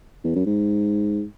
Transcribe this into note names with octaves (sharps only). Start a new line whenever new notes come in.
E2
F#2
G#2